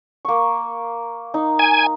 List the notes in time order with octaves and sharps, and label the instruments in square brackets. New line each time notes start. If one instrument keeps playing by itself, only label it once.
[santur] A#3 C#6
D#4
[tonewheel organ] G#5